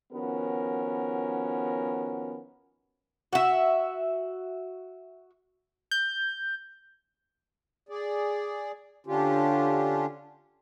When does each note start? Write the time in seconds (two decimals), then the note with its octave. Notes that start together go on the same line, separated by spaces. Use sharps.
0.12 D#3 F3 B3 C#4 F#4 A#4
3.33 F#4 E5
5.91 G6
7.89 G#4 D5
9.06 D3 C#4 D4 F4 G4